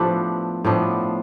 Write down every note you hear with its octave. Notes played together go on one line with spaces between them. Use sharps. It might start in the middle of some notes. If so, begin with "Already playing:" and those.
Already playing: A2 F3 B3 D4 G4 A4 B4
A2 F3 B3 D4